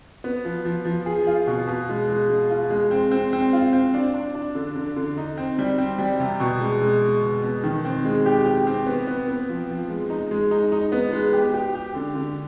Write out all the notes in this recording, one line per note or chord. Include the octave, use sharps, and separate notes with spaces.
B3
F3
F3
F3
G#4
F4
B2
B2
G#3
G#3
G#3
F4
G#3
C4
C4
C4
F4
C4
D4
D4
D4
D3
D3
D3
D#4
C4
G3
C4
G3
C3
B2
G#3
G#3
G#3
B2
B2
D#3
C4
G#3
G4
G4
C4
B3
B3
B3
F3
F3
G#3
D#4
G#3
D#4
D#4
B3
G#3
G4
G4
G4
D3
D3